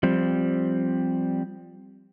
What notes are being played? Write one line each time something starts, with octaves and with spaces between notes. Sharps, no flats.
F3 G3 C4